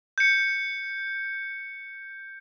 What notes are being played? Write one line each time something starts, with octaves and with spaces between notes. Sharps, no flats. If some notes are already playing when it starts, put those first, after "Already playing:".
G6 C#7